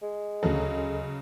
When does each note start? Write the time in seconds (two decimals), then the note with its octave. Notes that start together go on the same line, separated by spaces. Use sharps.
0.03 G#3
0.43 D2 C#3 F#3 A4